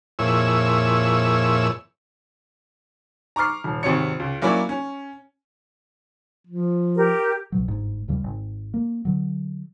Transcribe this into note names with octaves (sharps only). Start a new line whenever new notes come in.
F2 A#2 E4 G#4 C#5 E6
A#5 C#6 D6 F6 C7
D#1
G#1 C3 C#5 C#7
C#2
F#3 A#3 C#4 E4 C#5 D5
C#4
F3
G4 A#4
C2 B2 F#3
G1 G#2
D#2 C#3 G3
G#1
A#3
D3 F#3